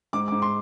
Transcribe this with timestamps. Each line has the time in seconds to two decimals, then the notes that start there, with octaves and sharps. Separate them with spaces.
0.13 G#2 D6
0.28 D6
0.32 G#2
0.42 C6